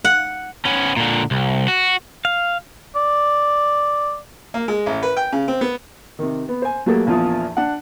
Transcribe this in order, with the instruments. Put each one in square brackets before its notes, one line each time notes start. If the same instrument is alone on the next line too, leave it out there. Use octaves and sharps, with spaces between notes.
[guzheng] F#5
[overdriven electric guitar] B3 C#4
A#2 D3
C2
F#4
[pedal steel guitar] F5
[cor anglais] D5
[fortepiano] A#3
G#3
A1
B4
G5
C#3
C4
B3
C3 D#3
B3
C5 G#5
F#3 G3 A3 A#3 G#4 A4
A#1 E2 F3 F4 D#6
D4 F#5